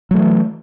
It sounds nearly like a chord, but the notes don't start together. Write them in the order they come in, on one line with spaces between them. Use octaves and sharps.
F#3 A3 E3